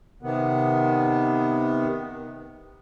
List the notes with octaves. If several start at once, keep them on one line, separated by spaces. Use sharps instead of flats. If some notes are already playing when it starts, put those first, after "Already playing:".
C3 D#3 B3